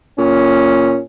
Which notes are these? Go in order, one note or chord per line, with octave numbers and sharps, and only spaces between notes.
A#2 C#4